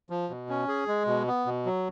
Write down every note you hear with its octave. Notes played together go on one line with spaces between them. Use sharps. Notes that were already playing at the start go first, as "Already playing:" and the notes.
F3
B2
C#4
G#4
G#3
B2
B3
B2
F#3